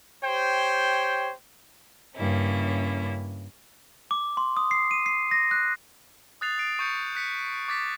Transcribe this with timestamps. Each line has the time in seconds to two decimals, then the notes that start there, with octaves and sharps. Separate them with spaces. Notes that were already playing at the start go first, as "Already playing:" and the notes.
0.23 G4 C5 C#5 G5
2.16 G2 C#3 A#3 C#4 E4
4.11 D6
4.37 C6
4.57 D#6
4.71 C7
4.91 D#7
5.06 C7
5.31 A#6
5.51 F#6
6.41 D#6 F#6 A6 C7 F7
6.58 D#6 C7 D7
6.79 C#6 G6 C#7
7.15 F#6 B6 C#7
7.68 D6 A6 B6